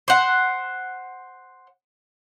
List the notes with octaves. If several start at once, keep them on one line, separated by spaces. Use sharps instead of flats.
C5 F#5